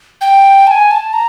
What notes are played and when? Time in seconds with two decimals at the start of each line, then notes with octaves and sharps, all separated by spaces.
0.21 G5
0.67 A5
0.71 G#5
0.91 A5
1.13 A#5